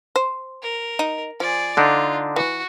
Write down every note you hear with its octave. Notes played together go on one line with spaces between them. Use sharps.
C5
A#4
D#4
F3 G#4 D5
D3 D4 D#4 F4
E3 F#4